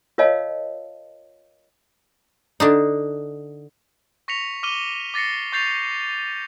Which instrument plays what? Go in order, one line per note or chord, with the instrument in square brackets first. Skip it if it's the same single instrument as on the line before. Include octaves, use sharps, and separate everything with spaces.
[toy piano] F4 A#4 C#5 D#5 F5 A5
[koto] D3 D4 D#4
[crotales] C#6 A#6 B6 C#7 F7
D6 F6 D#7 G7
D6 A6 A#6 C7 C#7
C#6 G6 A6 C7 F7